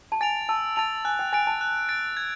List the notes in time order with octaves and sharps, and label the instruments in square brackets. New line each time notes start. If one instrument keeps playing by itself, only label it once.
[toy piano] A5
[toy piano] G#5 [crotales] A6 D7 F7
[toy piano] A5 [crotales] E6
[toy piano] A5 [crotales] A6 D7 F7
[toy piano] G#5 [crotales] F#6
[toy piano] G5
[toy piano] G#5 [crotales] A6 D7
[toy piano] A5
[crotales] F#6
A6 D7
G#6